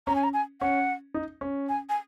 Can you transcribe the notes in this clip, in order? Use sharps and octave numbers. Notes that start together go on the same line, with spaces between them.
C#4 A#5
G#5
A#5
G#5
C#4 F#5
D#4
C#4
G#5
G#5